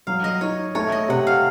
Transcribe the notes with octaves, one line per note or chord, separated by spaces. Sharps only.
F#3 F5
D#5
D#4 C#5
A3 C#5
D#5
C3 F#5
F5